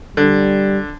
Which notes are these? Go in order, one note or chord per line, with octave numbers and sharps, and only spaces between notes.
D3 G3